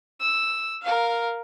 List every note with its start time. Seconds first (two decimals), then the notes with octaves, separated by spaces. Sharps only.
0.21 E6
0.82 A#4 F5